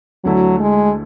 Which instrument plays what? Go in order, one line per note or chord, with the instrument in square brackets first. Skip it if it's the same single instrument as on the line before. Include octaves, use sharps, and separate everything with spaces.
[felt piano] D2 D3 A3 E4 [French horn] F#3
[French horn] G#3